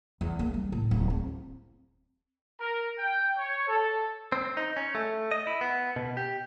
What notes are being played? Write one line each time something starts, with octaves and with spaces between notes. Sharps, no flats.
E2
A#3
G3
A2
D1
C4
A#4
G5
C#5
A4
C4
D#4
C#4
A3
D#5
E4
B3
B2
G4